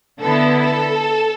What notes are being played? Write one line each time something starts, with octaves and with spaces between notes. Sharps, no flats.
D3 B3 E4 A4
A4